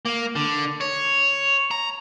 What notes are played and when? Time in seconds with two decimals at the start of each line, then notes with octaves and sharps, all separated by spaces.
0.05 A#3
0.36 D3
0.81 C#5
1.71 A#5